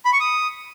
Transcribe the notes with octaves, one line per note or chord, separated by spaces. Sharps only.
B5
C#6
D#6